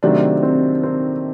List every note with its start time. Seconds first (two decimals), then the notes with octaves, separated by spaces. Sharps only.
0.03 C3 D#3 F#3 A3 C4 D4
0.43 C4
0.83 C4